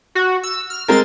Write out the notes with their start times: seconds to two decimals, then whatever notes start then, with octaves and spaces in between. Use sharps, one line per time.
0.15 F#4
0.43 E6
0.70 F6
0.88 G#3 C4 A#4 A6